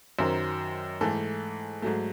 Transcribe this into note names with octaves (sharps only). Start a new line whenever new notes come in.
F#2 D#3 F#3 C5
G#2 E3 A3 A4
G#2 F#3 A3